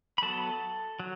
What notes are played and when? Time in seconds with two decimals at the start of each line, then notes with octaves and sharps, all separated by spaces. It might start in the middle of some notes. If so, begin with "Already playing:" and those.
0.18 B5
0.22 F#3 B3 A4 A5
1.00 F#3